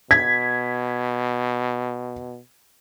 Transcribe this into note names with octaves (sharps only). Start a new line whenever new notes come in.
B2 G#6 B6